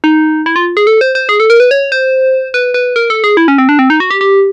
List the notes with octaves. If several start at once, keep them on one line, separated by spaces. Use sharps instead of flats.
D#4
E4
F4
G#4
A4
C5
C5
G#4
A4
A#4
B4
C#5
C5
B4
B4
A#4
A4
G#4
E4
C#4
C4
D4
C4
D#4
F#4
G4
G4